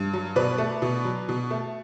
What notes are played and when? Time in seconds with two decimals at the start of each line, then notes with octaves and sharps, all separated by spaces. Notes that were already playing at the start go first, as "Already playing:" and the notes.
Already playing: G2
0.13 F#3
0.36 B2 B4 D5
0.58 A3
0.82 B2
1.05 F#3
1.29 B2
1.51 A3